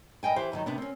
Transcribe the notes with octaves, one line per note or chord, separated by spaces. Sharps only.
G2 D#5 G5 G#5
E3 G4 C5
G2 D3 D#3 F#3
C3 B3 D4
C4 C#4